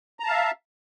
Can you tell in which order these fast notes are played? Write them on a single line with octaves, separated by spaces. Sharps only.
A#5 A5 F5 E5